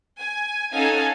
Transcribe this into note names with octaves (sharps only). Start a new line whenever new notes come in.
G#5
C#4 D#4 A4 F5 F#5 G#5